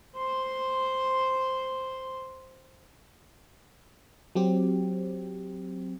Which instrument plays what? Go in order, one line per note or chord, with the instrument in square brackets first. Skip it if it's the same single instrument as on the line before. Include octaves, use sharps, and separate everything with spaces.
[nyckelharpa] C5 C6
[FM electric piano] F#3 C4 G4